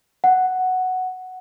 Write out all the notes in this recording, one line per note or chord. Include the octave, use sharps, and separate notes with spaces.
F#5